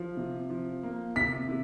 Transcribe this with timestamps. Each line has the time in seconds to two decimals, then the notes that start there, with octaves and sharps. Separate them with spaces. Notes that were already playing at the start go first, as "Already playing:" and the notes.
Already playing: F3
0.17 C3
0.50 F3
0.83 A#3
1.16 C3 B6
1.49 C3